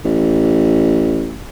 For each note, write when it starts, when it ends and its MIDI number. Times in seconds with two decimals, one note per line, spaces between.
0.05 1.36 33